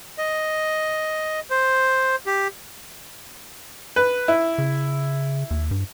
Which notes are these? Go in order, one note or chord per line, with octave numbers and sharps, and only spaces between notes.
D#5
C5
G4
B4
E4
C#3
D#2
G2